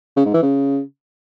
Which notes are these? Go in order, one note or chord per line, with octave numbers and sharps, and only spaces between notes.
C#3
G#2
E3
C#3